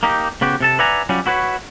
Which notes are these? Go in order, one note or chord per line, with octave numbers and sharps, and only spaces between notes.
A#3 D#4 G4
C#3 B3 F#4 G4
C3 A4 A5
B4 D5 E5 F#5 G#5 A#5
F#3 G3 C#4 F4 F#4
E4 F#4 B4 C#5